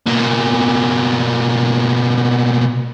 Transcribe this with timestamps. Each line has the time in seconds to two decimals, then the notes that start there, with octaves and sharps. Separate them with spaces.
0.06 B2 A#3